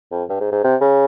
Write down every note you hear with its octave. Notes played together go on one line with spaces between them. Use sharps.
F2
G2
G#2
G#2
C3
C#3